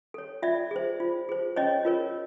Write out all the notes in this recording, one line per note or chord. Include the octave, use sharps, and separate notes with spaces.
A4 C#5
F4 D5 E5
G#4 C5
F4
G#4 C5
C#4 C#5 D#5
F4 A#4 C#5